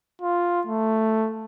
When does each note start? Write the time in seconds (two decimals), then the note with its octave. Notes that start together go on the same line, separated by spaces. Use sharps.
0.21 F4
0.67 A3